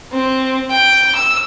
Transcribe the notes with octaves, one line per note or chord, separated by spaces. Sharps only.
C4
G5
E6